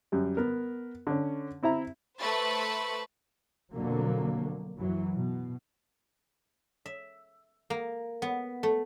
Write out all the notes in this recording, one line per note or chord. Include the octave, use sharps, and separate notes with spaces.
F#2 G3
B3 A#4
D3 C#4
C4 E4 E5 A#5
A3 B4 C5 B5 C#6 A6
F2 B2 D3 F#3 A#3
F#2 E3 F#3
B2
E5
A#3
B3
A3